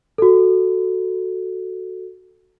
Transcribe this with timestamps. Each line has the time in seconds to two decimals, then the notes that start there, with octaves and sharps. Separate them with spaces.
0.18 F#4 A4